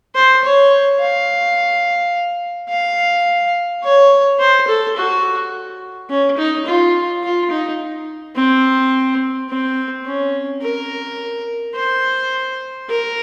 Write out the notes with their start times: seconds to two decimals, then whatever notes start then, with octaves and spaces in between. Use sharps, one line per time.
0.15 C5
0.44 C#5
1.00 F5
2.69 F5
3.84 C#5
4.40 C5
4.68 A4
4.97 F#4
6.10 C#4
6.37 D#4
6.66 F4
7.24 F4
7.51 D#4
8.36 C4
9.50 C4
10.07 C#4
10.63 A#4
11.76 C5
12.90 A#4